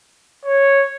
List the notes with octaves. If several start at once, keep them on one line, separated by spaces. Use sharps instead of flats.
C#5